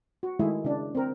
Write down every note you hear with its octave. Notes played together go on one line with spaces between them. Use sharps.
F#4
D#3 G#3 A3 E4 G#4
C#3 D4
C4 A#4